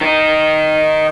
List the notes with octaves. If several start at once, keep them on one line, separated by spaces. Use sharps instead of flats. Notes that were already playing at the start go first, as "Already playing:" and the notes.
D#3 D#4